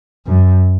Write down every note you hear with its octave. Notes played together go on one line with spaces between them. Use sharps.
F#2